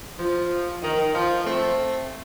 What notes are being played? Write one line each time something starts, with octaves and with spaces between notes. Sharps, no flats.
F3
D#3
F3
A3 C4